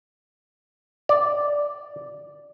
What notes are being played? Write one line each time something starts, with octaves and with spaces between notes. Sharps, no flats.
D5